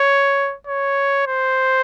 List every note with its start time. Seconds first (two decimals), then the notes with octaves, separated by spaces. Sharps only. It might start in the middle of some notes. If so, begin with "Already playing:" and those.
Already playing: C#5
0.67 C#5
1.28 C5